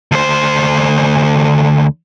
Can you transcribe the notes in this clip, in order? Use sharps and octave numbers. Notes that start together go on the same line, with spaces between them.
D2 C5